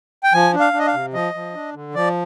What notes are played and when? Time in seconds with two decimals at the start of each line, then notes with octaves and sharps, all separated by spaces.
0.24 G5
0.33 F3 G#5
0.54 D4
0.60 F5
0.73 D4
0.79 D#5
0.87 F5
0.93 C3
1.13 F3 D#5
1.34 F3
1.54 D4
1.74 D3
1.95 F3 D5